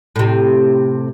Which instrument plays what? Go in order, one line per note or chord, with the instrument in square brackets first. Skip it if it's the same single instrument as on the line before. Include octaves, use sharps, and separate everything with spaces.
[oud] A2 C3